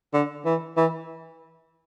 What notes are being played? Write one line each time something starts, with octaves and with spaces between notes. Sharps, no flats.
D3
E3
E3